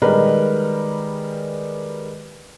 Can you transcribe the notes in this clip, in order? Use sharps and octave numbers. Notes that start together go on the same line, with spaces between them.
D#3 G3 G#3 A#4 B4